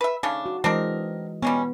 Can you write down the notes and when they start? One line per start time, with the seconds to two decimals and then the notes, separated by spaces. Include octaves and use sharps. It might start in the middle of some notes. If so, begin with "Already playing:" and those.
0.01 B4 E5
0.23 C#3 A3 D4 D#4
0.46 F#4
0.64 E3 G#3 C4 D4 A#4 D#5
1.42 G3 G#3 B3 C#4